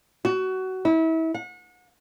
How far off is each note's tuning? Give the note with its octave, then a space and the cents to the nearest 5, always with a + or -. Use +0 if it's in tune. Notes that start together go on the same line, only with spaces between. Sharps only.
F#4 +20
E4 -30
F#5 -35